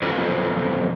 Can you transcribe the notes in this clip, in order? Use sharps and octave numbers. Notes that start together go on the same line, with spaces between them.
B1 F2